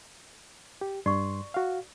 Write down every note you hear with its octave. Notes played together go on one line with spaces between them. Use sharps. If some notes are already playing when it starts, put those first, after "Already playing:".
G4
G2 D5 C6 C#6
F#4 F5